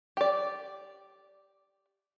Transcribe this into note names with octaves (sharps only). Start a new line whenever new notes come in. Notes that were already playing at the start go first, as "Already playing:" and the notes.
G4 D5